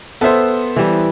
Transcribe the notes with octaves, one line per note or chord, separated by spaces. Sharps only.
B3 A4 C5 E5
E3 G3